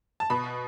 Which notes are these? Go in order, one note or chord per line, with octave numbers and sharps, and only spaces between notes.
A5
B2 B5